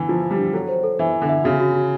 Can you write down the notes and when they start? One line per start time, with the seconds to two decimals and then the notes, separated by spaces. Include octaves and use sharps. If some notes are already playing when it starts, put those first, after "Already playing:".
Already playing: D3 E3
0.09 F3 F4
0.23 F4
0.31 G3
0.38 D4
0.53 F#3 A4
0.68 C5
0.84 A4
0.99 E3 E5
1.14 E5
1.22 D3
1.29 E5
1.44 C#3 F#4
1.60 F#4
1.75 F#4